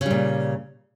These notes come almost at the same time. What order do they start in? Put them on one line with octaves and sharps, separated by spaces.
C#3 G3 A#2